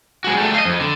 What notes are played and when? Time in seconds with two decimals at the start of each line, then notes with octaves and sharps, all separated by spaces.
0.24 G#3 F#4
0.37 G3 A3
0.54 D#5 F5
0.65 F2
0.80 D3